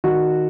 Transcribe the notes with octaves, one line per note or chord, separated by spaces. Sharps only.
D#3 F#4